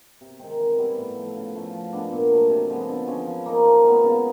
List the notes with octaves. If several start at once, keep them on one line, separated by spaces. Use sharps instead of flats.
C3
D#3 G#3 C4
E3
G3 B3 E4
A2
F3 A3
C#3
F3 A3 C#4
F3
G#3 B3 D4
A#2
F#3 A3
C3
F3 G#3 B3
D3
F3 G#3 C#4
F3
A#3 D#4
F3
G#3 B3
C#3